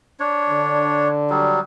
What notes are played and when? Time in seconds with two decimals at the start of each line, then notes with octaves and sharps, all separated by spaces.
0.20 D4 C#5
0.49 D3
1.30 F#3 G3